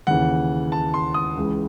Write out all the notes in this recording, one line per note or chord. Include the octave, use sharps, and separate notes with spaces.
D#2 C#3 E3 F#5
A5
C6
D#6
C#2 C#3 E3